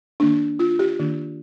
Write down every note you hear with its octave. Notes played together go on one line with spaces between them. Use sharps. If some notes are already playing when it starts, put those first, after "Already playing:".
D#3 A#3 D4
F4
G4
D#3 A#3 D4